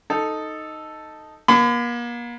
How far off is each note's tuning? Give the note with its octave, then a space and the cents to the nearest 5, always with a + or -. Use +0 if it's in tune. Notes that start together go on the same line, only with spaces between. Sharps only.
D#4 +0 A4 +0
A#3 +40 B5 +35